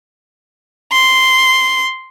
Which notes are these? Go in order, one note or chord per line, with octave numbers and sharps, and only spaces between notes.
C6